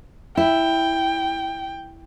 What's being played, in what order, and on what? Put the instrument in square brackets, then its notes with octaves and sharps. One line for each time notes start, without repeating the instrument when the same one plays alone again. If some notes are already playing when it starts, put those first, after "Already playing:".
[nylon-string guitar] E4 [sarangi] G5